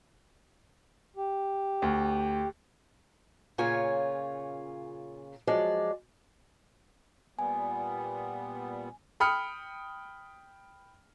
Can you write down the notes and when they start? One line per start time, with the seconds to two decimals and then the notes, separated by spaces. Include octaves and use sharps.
1.16 G4
1.82 D2
3.58 A#2 C#3 C#4 F4 C#5 G#5
5.47 F3 F#3 G#3 D5
7.39 A#2 G3 B3 G#5
9.20 G5 B5 D#6 F6 C#7